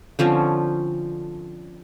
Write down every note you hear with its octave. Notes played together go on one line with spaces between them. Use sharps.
D3 F3 C4 C#4